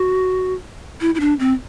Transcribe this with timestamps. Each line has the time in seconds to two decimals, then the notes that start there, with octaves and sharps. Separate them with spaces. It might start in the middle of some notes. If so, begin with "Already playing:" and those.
Already playing: F#4
1.01 E4
1.15 E4
1.20 D4
1.39 C4